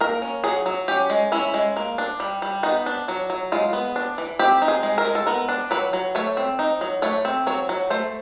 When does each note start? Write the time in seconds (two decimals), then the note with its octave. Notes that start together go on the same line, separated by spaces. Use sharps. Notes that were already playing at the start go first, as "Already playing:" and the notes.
0.01 A#3 A#4
0.22 C#4
0.44 F#3 G#4
0.66 F#3
0.88 C#4 G4
1.10 G#3
1.32 C#4 E4
1.54 G#3
1.77 A#3
1.98 D4
2.20 G3
2.42 G3
2.63 B3 D#4
2.86 D4
3.08 F#3
3.30 F#3
3.52 G#3 F4
3.73 B3
3.96 D4
4.18 E3
4.39 C4 G4
4.62 D#4
4.68 G#4
4.83 G#3
4.98 A#4
5.05 G#3
5.15 A4
5.27 B3 A#4
5.49 D4
5.71 F#3 B4
5.93 F#3
6.15 A3 C#5
6.37 C4
6.59 D#4
6.81 F#3
7.02 A3 C#5
7.25 C4
7.47 F#3 C#5
7.69 F#3
7.90 A3 C5